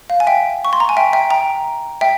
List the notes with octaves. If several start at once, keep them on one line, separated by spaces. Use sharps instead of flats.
F5
G#5
E5 G5
C#6
C6
A#5
G#5
E5 G5
E5 G5
G5 A#5
E5 G5